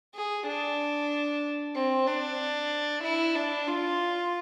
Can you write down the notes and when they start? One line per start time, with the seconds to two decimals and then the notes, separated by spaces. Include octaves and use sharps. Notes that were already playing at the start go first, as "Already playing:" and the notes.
0.14 G#4
0.46 D4
1.75 C4
2.07 D4
3.03 E4
3.35 D4
3.67 F4